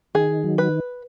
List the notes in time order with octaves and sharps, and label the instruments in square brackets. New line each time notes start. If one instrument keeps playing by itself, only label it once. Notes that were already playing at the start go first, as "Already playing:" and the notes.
[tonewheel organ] D#3 [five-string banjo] G#4
[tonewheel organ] F#3
[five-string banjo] B4